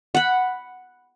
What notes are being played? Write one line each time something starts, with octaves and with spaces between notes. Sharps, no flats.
F#5 B5